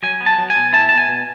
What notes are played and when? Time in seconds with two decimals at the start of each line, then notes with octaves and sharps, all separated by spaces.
0.03 F#3 G#5
0.21 B3
0.26 A5
0.38 F#3
0.50 G#5
0.56 B2
0.73 E4 A5
0.89 B2 A5
0.98 G#5
1.09 B2